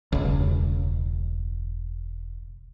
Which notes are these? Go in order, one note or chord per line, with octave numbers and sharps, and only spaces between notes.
E1 C#2